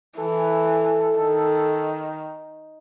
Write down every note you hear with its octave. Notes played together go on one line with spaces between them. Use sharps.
E3 A4
D#3